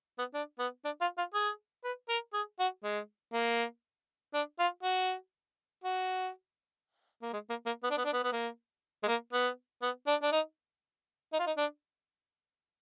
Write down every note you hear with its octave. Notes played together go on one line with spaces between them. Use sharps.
B3
D4
B3
D4
F4
F4
G#4
B4
A#4
G#4
F#4
G#3
A#3
D4
F4
F#4
F#4
A#3
G#3
A#3
A#3
B3
D4
B3
D4
B3
B3
A#3
G#3
A#3
B3
B3
D4
D4
D#4
D#4
F4
D#4
D4